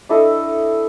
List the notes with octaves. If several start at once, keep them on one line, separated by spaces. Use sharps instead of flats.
D4 E4 A4 D#5